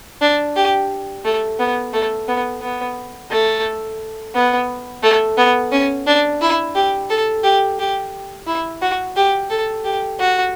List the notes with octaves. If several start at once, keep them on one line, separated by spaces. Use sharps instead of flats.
D4
G4
A3
B3
A3
B3
B3
A3
B3
A3
B3
C#4
D4
E4
G4
A4
G4
G4
E4
F#4
G4
A4
G4
F#4